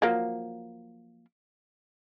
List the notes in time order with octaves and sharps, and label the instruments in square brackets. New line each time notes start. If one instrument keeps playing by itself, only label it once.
[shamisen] F3 F#3 A#3